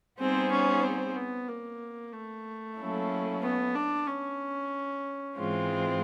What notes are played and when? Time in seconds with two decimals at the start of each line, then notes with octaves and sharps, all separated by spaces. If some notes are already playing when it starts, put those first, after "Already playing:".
0.19 G3 B3 C4 D#4 G#4 C5
0.52 C#4
0.83 C4
1.16 B3
1.48 A#3
2.12 A3
2.78 F#3 A#3 C#4 E4 A4
3.42 B3
3.75 D4
4.07 C#4
5.36 G#2 E3 G#3 C4 F4